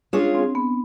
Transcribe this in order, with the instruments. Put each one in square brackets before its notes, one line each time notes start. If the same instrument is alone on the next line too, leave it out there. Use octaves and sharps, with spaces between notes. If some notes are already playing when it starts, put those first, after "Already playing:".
[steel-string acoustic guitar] G#3 C#4 F4 G#4 C#5 [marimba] D4
[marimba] C4
B3